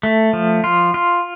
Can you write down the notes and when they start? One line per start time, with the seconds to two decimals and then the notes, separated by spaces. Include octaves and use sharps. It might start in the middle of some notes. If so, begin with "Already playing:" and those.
0.03 A3
0.33 F3
0.64 F4
0.94 F4